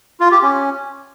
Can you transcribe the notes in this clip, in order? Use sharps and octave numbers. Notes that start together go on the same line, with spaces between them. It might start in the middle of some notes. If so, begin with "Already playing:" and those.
F4
G4
C#4